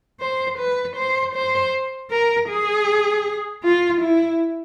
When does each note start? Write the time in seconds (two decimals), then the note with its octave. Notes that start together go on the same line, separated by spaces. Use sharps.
0.21 C5
0.59 B4
0.97 C5
1.35 C5
2.11 A#4
2.49 G#4
3.64 F4
4.02 E4